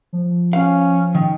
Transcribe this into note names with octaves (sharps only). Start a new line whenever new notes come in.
F3
C#4 F5
D#3